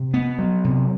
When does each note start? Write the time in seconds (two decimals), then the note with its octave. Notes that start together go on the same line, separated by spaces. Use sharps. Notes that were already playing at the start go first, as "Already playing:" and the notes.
Already playing: C3
0.14 B3
0.39 F#3
0.64 C3